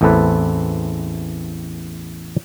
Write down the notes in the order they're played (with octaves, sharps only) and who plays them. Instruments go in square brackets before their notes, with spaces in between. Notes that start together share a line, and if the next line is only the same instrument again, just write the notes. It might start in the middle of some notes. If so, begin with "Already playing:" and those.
[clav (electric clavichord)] A1 E2 A3 C4 A4 B4